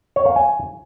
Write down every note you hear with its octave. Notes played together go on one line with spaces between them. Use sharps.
C#5
F5
G#5